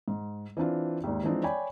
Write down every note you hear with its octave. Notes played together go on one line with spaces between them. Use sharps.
G#2
E3 C4 D4 F4
G#1 D#2
E3 F3 G#3 C4 D4 D#4
C#5 D5 G5 G#5 B5